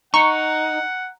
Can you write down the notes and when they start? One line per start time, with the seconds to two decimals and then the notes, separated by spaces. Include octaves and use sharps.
0.14 D#4 F#5 A#5 C#6